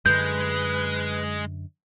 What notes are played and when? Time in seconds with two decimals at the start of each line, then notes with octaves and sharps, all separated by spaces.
0.06 F#2 D3 G#3 B4 G6